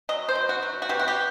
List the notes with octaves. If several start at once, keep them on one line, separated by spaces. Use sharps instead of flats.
F#3 D#5
C5
B2
F#4
F#3
F#4
B2 G4
F#4
G4